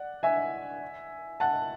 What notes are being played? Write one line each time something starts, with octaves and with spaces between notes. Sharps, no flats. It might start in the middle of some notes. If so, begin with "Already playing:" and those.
Already playing: D5 F#5
E5 G#5
F#5 A5